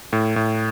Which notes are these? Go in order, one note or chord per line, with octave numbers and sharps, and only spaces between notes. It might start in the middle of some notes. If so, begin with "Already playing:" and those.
A2
A2